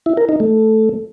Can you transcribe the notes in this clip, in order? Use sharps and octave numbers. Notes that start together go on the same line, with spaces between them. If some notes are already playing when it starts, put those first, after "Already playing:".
E4
A#4
D#4
A3